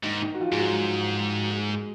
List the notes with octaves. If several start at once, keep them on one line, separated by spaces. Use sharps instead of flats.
G#2 D#3 D#4
D#3 D#4
F#4
F3 F4
G#2 G#4
F#3 F#4
G#3 G#4
G#3 G#4